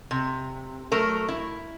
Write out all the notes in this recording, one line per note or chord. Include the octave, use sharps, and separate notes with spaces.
C3
F#3 A3 A#4
E4